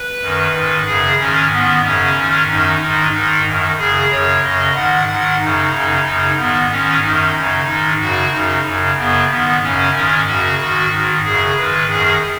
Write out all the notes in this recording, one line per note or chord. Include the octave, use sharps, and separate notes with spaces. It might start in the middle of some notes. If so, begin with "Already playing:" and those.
Already playing: B4
F#2 D#3
G#2 D#3
F#2 C#3 G#4
G#2 D#3 C#4
G#2 D#3 B3
F#2 C#3 C#4
G#2 D#3
F#2 D#3 D#4
G#2 D#3 D#4
G#2 D#3 D#4
F#2 D#3
F#2 C#3 G#4
F#2 C#3 C#5
F#2 C#3 D#5
G#2 D#3 F#5
G#2 D#3 F#5
F#2 C#3 D#4
F#2 C#3
F#2 C#3
G#2 D#3 B3
G#2 D#3 C#4
F#2 D#3 D#4
F#2 C#3
G#2 D#3
F#2 C#3 F#4
F#2 C#3 D#4
F#2 C#3
F#2 C#3 B3
G#2 D#3 B3
F#2 C#3 C#4
G#2 D#3 C#4
F#2 C#3 F#4
G#2 D#3 F#4
G#2 D#3
F#2 C#3 G#4
G#2 D#3 B4
F#2 D#3 G#4